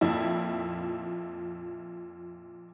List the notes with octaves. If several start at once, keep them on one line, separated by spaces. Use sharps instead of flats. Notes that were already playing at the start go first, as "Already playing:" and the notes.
F2 A#2 E4 E5